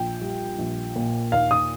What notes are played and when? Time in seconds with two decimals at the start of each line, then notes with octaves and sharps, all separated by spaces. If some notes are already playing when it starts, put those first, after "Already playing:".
Already playing: A#1 G5
0.21 G3
0.59 A#1
0.96 A#2
1.32 D#2 F5
1.51 D#6